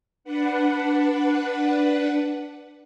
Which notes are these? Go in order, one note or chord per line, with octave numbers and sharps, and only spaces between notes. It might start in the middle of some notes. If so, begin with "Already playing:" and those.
D4 B4 F#5